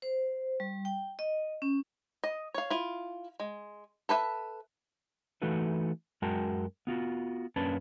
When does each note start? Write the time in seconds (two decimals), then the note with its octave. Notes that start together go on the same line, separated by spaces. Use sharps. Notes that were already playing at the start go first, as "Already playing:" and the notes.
0.02 C5
0.60 G3
0.85 G5
1.19 D#5
1.62 C#4
2.24 D#5
2.54 C#5 F5
2.70 E4 F4
3.40 G#3
4.09 A4 B4 C5 E5
5.42 E3 A3 D#4 F#4 A4 B4
6.22 F#2 G#3 F#4 A#4 G5 A5
6.87 B3 F4 F#4
7.56 F#2 A#3 C#4 D4 B4 A5